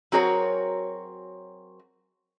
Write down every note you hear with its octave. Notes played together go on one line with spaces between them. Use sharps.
F#3 C4 F#4 G#4 A#4 C#5